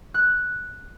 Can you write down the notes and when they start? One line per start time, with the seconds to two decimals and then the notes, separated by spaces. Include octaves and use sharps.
0.14 F#6